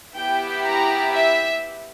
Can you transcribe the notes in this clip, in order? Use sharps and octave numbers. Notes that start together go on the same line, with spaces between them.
B3 E4 G4 G5
A#5
E5